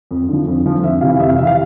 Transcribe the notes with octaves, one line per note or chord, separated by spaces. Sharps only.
F2
D3 F3
F2
D3 F3
F2 E5
C3 E3 F5
F2 E5
F5
C3 E3 E5
F5